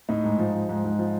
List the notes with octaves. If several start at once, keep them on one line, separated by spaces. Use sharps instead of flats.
A2 D#4
G#2
F3
F3
G#2
G#2
F3